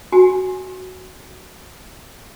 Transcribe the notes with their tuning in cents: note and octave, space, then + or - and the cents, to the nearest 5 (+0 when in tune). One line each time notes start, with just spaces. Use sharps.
F#4 +0 G#5 +0